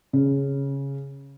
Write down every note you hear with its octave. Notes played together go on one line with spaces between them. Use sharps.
C#3